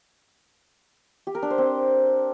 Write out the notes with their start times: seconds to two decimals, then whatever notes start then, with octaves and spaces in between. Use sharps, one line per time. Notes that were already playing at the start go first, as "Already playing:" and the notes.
1.27 G4
1.35 A#4
1.42 D4
1.50 C5
1.58 C4